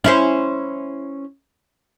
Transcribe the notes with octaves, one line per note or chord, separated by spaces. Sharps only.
C#4 E4 C5